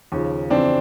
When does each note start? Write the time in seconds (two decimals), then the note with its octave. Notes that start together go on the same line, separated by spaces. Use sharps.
0.12 D#2 C#3 F3
0.50 F2 C#3 E3 C4 D4